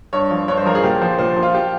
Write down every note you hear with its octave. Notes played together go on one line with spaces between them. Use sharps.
G2 C#5
F3
G2 C#5
C5
F3 A#4
G#4
A#2 G4
F3 C5
A#2 C5
F3
F4
G4